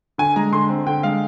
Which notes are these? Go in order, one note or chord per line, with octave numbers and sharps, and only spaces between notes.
D3 G#5
G#3 A#5
D3 C6
C4
D3 G5
G#3 F5